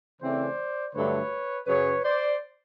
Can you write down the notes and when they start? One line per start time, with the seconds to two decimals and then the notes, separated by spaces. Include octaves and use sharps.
0.21 C#3 E3 A3 C4 C5 D5
0.94 G2 D3 F#3 A3 B4 C#5
1.67 F#2 C#3 F#3 B4 C#5
2.04 C5 D5